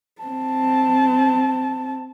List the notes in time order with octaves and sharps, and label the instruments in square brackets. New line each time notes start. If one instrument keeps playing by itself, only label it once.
[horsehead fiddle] C4 A5